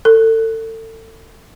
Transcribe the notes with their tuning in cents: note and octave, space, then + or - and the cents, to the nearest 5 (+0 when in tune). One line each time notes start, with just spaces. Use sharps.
A4 +30